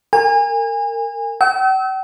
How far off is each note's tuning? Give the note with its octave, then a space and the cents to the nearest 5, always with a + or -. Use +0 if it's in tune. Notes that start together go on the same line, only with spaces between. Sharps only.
A#4 -30 G#5 -30
G5 -45 E6 -35